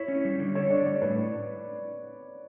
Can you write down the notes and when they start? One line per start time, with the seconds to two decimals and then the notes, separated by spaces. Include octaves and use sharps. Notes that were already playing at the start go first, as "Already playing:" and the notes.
Already playing: E4 C#5
0.08 C#4
0.25 G3
0.40 D3
0.55 A4 C#5
0.70 D4 D5
0.86 G3 C#5
1.02 A2 B4